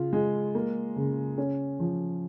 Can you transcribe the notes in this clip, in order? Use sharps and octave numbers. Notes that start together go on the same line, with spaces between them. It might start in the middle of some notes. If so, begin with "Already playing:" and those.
Already playing: C#3 F4
G#3
A#3
C#3
C#4
F3